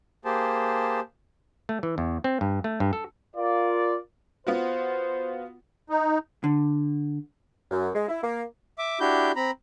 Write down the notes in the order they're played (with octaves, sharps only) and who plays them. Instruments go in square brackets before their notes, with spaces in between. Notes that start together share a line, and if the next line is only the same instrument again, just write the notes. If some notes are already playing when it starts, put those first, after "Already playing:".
[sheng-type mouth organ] A#3 G4 G#4 C5 A5
[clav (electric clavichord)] A3
E3
E2
C4
G2
A3
G2
A4
[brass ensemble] F4 A#4 D5
[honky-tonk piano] B3 F4 F#4 [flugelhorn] C5
[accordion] D#4
[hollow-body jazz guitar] D3
[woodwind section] F#2
G#3
E4
A#3
[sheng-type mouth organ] E5 D6
D4 E4 F#4 G4 G6
C4 A#5 B5